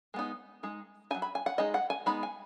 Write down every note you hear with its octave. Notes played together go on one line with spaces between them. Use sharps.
G#3 B3 D#4
G#3 D#4
F#3 D#4 G#5
B5
G#5
F#5
G#3 D#4 D#5
F#5
G#5
G#3 B3 D#4 B5
G#5